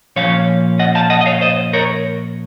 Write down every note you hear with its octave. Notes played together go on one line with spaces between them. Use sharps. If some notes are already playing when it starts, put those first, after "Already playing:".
A#2 F3 A#3 C#4 C#5 F5
D#5 F#5
F5 A5
D#5 F#5
D#5
C#5 F5
C5 D#5
A#4 C#5